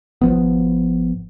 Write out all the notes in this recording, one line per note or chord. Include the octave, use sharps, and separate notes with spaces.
G#1 F3 B3